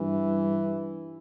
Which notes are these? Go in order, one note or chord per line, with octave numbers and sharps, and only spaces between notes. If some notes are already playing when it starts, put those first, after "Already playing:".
Already playing: G2 E3